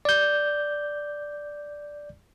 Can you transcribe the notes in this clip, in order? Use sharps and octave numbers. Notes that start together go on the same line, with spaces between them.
D5 G6